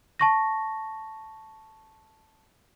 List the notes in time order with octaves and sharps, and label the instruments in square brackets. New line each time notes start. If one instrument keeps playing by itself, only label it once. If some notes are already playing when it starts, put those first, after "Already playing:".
[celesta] A5 C#6 A#6